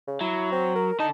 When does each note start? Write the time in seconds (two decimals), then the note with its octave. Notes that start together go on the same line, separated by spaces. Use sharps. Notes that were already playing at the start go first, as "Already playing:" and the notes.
0.07 C#3
0.21 F#3 E4
0.52 C4
0.75 A#4
1.00 D3 D#4 A5